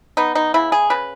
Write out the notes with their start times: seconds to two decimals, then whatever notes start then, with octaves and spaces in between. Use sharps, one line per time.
0.17 B3 D#4
0.35 D#4
0.54 C#3 E4
0.72 G#4
0.90 C#3 B4